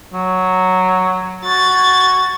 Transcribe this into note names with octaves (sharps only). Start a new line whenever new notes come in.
F#3
F#4 G#6 A6